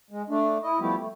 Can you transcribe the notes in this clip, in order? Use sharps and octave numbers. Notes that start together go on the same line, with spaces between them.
G#3
A3 D4
E4 D#5
F3 G3 A3 B3 E4 G4
A3